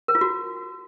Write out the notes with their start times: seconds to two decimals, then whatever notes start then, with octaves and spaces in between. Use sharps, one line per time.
0.08 A#4
0.15 F4
0.21 F#4